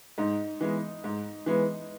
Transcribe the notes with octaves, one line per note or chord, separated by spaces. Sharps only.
G#2 D#4
E3 G#3 B3
G#2
E3 G#3 B3